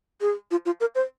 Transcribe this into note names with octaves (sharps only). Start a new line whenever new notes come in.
G#4
F4
F4
A#4
C5